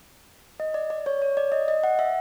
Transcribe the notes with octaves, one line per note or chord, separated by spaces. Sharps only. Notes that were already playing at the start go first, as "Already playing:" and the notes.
D#5
D5
D5
C#5
C#5
D5
D#5
D#5
F#5
E5